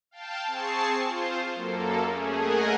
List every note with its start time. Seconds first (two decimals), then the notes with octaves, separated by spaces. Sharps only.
0.11 F5 G5 A5
0.47 C4 G#4 A5 C#6 C7
1.00 F4 C5
1.53 F#2 A#3 A4
2.05 A3 C#4 G#4
2.34 A3 G#4 A#4 D#5 F#5 G#5